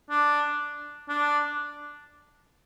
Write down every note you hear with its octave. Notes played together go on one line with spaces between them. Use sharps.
D4
D4